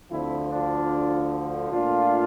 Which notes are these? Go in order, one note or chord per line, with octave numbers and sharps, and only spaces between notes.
D2 D3 F3 C4 E4
D4 F4
A#2 A3 D4 F4